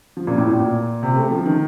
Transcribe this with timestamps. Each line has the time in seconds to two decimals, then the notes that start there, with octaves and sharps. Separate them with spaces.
0.17 F3
0.27 A#2
0.38 A2
0.49 A#2
0.60 A#2
1.03 C3
1.16 A3
1.31 F3
1.46 D#3